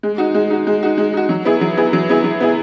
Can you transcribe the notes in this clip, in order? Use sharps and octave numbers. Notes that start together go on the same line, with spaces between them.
G#3
D#4 F#4
G#3
D#4 F#4
G#3
D#4 F#4
G#3
D#4 F#4
F#3
B3 E4 G#4
F#3
B3 E4 G#4
F#3
B3 E4 G#4
F#3
B3 E4 G#4